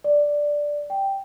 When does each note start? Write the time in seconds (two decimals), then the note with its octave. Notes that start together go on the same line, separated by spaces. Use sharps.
0.04 D5
0.90 G5